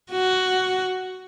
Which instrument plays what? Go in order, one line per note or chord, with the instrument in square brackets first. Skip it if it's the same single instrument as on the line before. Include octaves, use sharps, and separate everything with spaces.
[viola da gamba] F#4